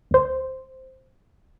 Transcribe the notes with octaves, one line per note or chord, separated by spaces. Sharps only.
D2 C5